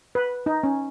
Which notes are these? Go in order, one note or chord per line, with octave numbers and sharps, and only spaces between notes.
B4
D#4
C#4